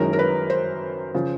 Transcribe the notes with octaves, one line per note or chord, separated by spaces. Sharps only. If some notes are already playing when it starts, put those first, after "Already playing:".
Already playing: F#1 F#2 D#3 G#3 C#4 A#4
A#4
B4
C5
C#3 F3